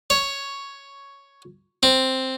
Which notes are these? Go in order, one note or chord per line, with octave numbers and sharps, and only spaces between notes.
C#5
C4